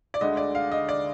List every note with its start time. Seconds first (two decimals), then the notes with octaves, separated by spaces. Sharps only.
0.14 D5
0.21 D2 D3 G#3 D#5
0.37 D5
0.55 F5
0.72 D#5
0.89 D5